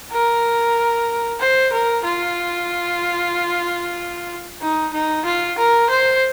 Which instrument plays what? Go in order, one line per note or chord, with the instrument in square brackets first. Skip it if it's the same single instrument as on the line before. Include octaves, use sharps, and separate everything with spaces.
[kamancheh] A#4
C5
A#4
F4
D#4
D#4
F4
A#4
C5